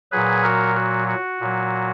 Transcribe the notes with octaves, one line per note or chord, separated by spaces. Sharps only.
A#2 F#3 G#4 B4
F#4 A#4
F#4
F#4
A#2 F#3